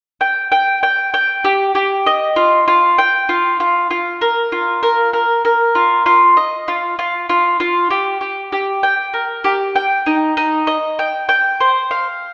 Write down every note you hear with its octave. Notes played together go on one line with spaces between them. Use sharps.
G5
G5
G5
G5
G4
G4
D#5
F4
F4
G5
F4
F4
F4
A#4
F4
A#4
A#4
A#4
F4
F4
D#5
F4
F4
F4
F4
G4
G4
G4
G5
A#4
G4
G5
D#4
D#4
D#5
G5
G5
C5
F5